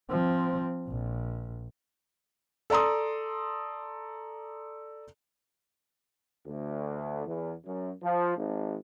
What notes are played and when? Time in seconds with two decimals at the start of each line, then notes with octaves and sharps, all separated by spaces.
0.10 F3 C4
0.88 A#1
2.70 A4 D5 A#5 C6 D#6
6.46 D2
7.26 E2
7.65 F#2
8.03 F3
8.37 G#1